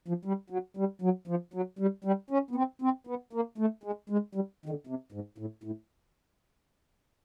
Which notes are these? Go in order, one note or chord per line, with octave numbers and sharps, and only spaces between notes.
F3
G3
F#3
G3
F#3
F3
F#3
G3
G3
C#4
B3
C4
C4
B3
A#3
A3
G#3
G#3
G3
D#3
D3
C3
G#2
A2
A2